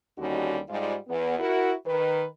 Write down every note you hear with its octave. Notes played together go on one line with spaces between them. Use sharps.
D#2 D3 G3 C#4 D#4 F#4
G#2 G3 F4
E2 B3
E4 F#4 A#4
D#3 B4